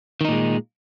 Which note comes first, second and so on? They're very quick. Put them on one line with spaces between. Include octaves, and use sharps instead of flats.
D#3 D#4 A#2 G#3